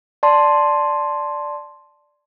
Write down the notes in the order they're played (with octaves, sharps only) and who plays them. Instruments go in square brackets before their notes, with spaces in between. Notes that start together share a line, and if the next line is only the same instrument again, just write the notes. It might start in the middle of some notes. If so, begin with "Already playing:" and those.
[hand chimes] D5 A5 C6